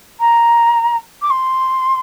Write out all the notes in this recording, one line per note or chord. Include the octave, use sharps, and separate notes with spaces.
A#5
D6
C6